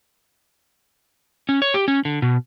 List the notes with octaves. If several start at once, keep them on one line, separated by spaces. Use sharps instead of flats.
C#4
C#5
G4
C#4
D3
B2